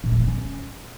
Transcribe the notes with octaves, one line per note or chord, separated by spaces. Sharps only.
A#2
B3
A3
C#4